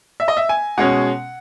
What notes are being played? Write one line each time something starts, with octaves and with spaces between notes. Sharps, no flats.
E5
D#5
E5
G#5
B2 G#3 C#4 F#5